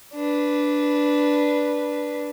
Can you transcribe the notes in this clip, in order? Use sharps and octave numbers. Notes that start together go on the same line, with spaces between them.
D4 B4